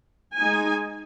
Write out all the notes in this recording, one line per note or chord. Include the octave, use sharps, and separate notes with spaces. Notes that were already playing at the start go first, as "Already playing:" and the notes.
G#3 D#4 G#5